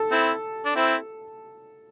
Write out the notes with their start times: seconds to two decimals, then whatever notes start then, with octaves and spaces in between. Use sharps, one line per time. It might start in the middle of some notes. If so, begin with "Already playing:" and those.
Already playing: A4
0.11 C4 E4
0.65 D4
0.76 C4 E4